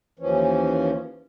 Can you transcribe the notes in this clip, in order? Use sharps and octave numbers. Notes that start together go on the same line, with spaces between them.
D#2 E3 F3 C#4